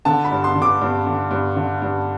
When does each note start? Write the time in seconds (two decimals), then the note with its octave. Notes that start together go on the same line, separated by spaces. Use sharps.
0.05 D3 A5
0.25 B5
0.32 G2
0.44 C6
0.56 D3
0.62 D6
0.82 G2
1.06 D3
1.31 G2
1.57 D3
1.82 G2